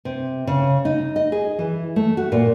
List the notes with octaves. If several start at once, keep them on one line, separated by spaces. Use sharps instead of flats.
C3
C#3
D#4
D#5
G#4
E3
A3
F#4
A#2